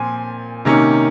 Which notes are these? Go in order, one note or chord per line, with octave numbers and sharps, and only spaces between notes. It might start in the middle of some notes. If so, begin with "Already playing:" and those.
Already playing: A#2 F3 C4 G#5
C3 D#3 A#3 C#4